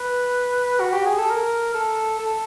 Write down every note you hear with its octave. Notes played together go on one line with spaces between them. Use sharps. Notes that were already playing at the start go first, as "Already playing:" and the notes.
Already playing: B4
F#4
G4
G#4
A4
A#4
A4
A4